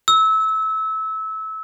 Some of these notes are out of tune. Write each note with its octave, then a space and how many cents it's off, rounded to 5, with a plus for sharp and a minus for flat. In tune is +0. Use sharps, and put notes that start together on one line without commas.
E6 -25